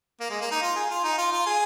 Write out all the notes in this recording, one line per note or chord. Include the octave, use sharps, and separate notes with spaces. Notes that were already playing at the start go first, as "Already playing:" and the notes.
A#3
G#3
A#3
D#4
F4
G#4
F4
D#4
F4
F4
G#4